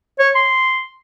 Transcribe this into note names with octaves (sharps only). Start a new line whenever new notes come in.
C#5
C6